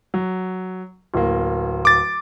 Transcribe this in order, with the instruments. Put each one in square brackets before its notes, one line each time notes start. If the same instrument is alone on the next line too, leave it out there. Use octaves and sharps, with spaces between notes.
[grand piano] F#3
D1 A#3
[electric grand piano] D6 A6